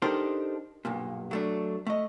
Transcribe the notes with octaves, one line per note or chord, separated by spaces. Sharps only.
D4 D#4 G4 A4 A#4 C5
B1 G2 A#2
F#3 A3 D4
A3 D#5